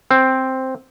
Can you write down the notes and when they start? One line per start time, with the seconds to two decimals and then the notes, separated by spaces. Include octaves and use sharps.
0.11 C4